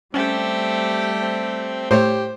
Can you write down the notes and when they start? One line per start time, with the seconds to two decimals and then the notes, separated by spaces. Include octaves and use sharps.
0.14 G3 A3 C4 C#4 G4
1.21 C4
1.91 A2 A3 G4 C5 C#5